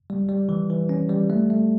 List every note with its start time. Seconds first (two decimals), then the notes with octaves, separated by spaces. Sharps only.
0.10 G3
0.29 G3
0.49 E3
0.70 E3
0.89 C#4
1.09 G3
1.30 A3
1.50 A3